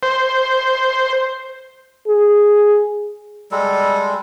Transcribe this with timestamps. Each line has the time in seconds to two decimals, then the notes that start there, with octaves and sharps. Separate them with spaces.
0.03 C5
2.07 G#4
3.51 G3 G#3 A4